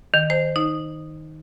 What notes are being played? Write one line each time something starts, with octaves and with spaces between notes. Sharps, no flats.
D#3
C5
D#4